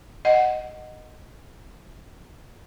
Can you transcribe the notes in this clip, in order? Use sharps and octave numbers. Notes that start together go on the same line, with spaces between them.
D#5 F#5